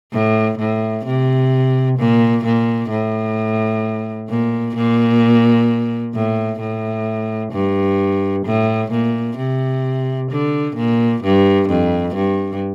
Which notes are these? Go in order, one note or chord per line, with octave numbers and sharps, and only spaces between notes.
A2
A2
C3
A#2
A#2
A2
A#2
A#2
A2
A2
G2
A2
A#2
C3
D3
A#2
G2
F2
G2